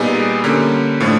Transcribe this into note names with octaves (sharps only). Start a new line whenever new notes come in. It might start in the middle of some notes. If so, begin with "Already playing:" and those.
Already playing: A#2 G3 B3 D#4 G#4
D3 G3 A#3 C#4
A2 F3 A3 D4